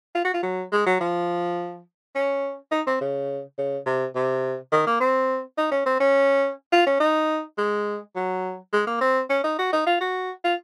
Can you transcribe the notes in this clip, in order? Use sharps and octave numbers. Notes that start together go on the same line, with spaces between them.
F4
F#4
F4
F#3
G#3
F#3
F3
C#4
D#4
C4
C#3
C#3
C3
C3
D#3
A#3
C4
D#4
C#4
C4
C#4
F4
C#4
D#4
G#3
F#3
G#3
A#3
C4
C#4
D#4
F#4
D#4
F4
F#4
F4